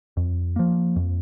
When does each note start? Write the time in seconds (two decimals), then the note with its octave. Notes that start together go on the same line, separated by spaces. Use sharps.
0.17 F2
0.56 F3 A#3
0.96 F2